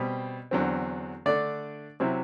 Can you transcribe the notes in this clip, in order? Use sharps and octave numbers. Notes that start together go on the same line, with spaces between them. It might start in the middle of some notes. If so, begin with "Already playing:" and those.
Already playing: B2 G3 C4
E2 D3 F#3 C4
D3 A3 D4 D5
C3 F#3 C4 E4